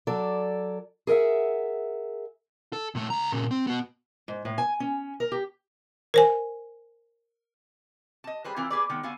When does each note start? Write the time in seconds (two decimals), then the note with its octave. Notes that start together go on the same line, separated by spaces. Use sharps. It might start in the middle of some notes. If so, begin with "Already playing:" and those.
0.07 F#3 A4 D5
1.07 G#4 A#4 D#5 E5 F#5
2.73 A4
2.95 A#2 A3
3.10 C#2 A#5
3.32 A#2 C#3
3.51 C4
3.67 B3 F#4
4.28 G#2
4.45 A2
4.58 G#5
4.80 C#4
5.20 A#4
5.32 G4
6.14 A#4 C5 G#5
8.24 D#5 A5
8.44 G3 G#4 B4 C5
8.56 E3 A#3 C4 F4 A#4
8.70 A#3 G#4 B4 D5
8.90 D#3 G#3 B3
9.03 D3 B3 F#4 F5 G#5